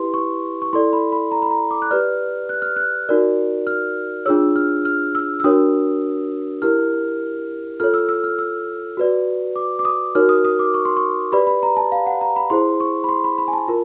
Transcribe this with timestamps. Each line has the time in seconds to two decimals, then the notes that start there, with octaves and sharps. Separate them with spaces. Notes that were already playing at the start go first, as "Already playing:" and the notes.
Already playing: E4 G4 B4 C6
0.14 C#6
0.62 C#6
0.73 E4 A4 D5 C6
0.93 B5
1.12 B5
1.31 A#5
1.42 B5
1.51 A#5
1.71 D6
1.82 F#6
1.91 G4 B4 D5 F6
2.49 F#6
2.62 F6
2.76 F#6
3.09 D#4 F#4 A#4 D5
3.67 F6
4.26 D4 F4 G#4 C#5 E6
4.56 F6
4.85 F6
5.15 E6
5.40 E6
5.44 D4 F#4 A#4 C#5 D#6
6.62 E4 G4 A#4 F6
7.80 F4 A4 C#5 F6
7.94 E6
8.09 E6
8.24 F6
8.39 E6
8.97 F#4 B4 D5
9.56 D6
9.79 D6
9.85 D#6
10.15 D#4 F#4 A#4 C#5 F6
10.29 D#6
10.45 D#6
10.59 D6
10.74 C#6
10.85 C6
10.97 C#6
11.32 G4 B4 D5 B5
11.47 B5
11.63 A#5
11.77 A5
11.92 F5
12.06 F#5
12.21 A#5
12.36 B5
12.50 E4 G#4 C5 C6
12.80 C#6
13.04 B5
13.09 C6
13.24 B5
13.38 B5
13.48 G#5
13.53 A5
13.68 F4 A#4